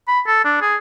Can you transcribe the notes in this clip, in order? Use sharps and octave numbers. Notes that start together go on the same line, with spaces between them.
B5
A4
D4
G#4